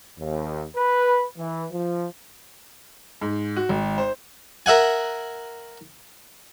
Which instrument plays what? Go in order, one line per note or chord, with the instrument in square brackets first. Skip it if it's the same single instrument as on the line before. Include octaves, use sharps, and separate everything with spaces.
[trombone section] D#2
B4
E3
F3
[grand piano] G#2
F#4
G#1
C5
[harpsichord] A#4 E5 F#5 G#5